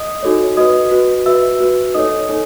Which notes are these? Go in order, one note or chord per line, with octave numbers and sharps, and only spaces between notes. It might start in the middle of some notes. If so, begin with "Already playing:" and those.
Already playing: D#5 D#6
D#4 F#4 A4 C#5
F#4 B4 D#5 D#6
F#4 B4
F#4 B4 E5 E6
F#4 B4
D#4 A4 C#5 D#5 D#6
D#4 A4 C#5